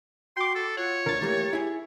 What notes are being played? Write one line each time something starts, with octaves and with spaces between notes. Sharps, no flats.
F#4 G5 C6 D6
A4
F4 C#5 F#5
D2 D3 A#4 A6
E3 A3 A#3 G4
E4 G#4